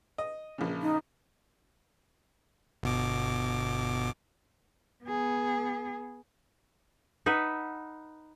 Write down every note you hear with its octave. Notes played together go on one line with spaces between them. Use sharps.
D#5
A#1 C#3
D#4
G1 B2 D6
B3 G#4
D#4 B4 E5 F#5